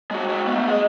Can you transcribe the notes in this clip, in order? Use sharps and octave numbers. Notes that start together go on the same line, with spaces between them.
G#3 F#4
G#3 F#4
A3 B3
G#4 D#5